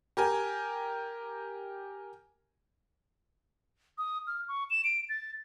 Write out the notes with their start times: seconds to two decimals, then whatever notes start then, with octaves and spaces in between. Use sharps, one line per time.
0.17 G4 A#4 G#5
3.98 D#6
4.27 F6
4.48 C#6
4.70 E7
4.84 D7
5.09 A6